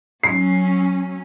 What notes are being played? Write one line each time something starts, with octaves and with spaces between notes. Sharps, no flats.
F#3 C#4 C7